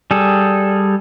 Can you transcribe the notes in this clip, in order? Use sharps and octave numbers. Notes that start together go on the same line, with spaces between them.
G3 G#4 A4